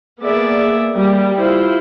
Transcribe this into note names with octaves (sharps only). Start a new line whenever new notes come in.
A#3 B3 G#4 D5 E5
G3 A#3
E4 F4 C5